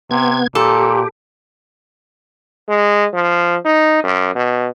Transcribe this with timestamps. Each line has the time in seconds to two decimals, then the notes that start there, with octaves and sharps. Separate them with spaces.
0.11 C3 B3 G#6
0.55 A#2 G4 A4
2.69 G#3
3.14 F3
3.65 D#4
4.04 F#2
4.35 B2